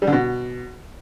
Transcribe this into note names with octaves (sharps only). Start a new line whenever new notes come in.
G3
D3
B2